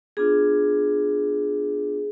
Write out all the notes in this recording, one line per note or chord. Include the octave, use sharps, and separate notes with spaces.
B3 D4 F4 G#4